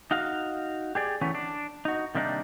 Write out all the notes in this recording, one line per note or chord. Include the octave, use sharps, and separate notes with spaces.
D#4 F#4 F5
G4 G#4 D5
E3 F#3 A3 B3 C#4
D4
D#4 F#4
C3 D#3 G3 A#3 D4 D#4